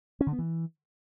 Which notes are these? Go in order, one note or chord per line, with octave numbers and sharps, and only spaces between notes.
C#4
D3
B3
E3